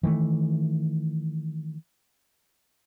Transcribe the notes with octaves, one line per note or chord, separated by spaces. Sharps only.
D#3 E3 G#3 A3